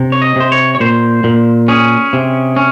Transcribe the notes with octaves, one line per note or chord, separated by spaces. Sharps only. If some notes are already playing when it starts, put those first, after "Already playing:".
Already playing: C3
C#5
D#5
C3 C5
C#5
C#5
A#2 C5
A#2
C#4 G#4
C3
C#4